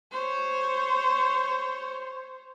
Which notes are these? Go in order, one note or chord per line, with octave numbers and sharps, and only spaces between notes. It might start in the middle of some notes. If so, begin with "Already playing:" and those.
C5 C#5